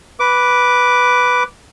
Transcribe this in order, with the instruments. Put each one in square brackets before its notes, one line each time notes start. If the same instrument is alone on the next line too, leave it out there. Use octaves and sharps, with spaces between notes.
[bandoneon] B4 D6